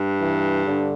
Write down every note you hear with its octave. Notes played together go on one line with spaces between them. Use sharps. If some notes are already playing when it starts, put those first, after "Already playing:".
Already playing: G2
E3
D3